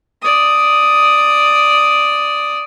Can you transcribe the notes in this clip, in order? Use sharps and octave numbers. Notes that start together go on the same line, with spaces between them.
D5 D#6